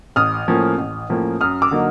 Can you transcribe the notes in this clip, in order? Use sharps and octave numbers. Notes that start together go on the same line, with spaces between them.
A1 D#6 F6
A2 F3 A#3 C#4
A1
A2 F3 A#3 C#4
F#2 D#6 F6
D6 E6
D3 F#3 A#3 D#4